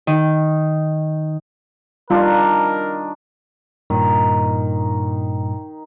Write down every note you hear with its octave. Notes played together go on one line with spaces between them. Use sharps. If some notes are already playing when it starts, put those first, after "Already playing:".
D#3
D#3 G3 D4 F4 A#4
G2 A#2 D#3 D#4